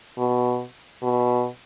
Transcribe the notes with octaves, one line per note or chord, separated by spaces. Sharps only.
B2
B2